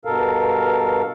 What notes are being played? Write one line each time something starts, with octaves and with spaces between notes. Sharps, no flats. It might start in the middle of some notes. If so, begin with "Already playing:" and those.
G2 B2 A4 A#4 F5